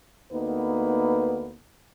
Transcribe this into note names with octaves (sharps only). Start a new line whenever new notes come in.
D2 A#3 B3 D#4 B4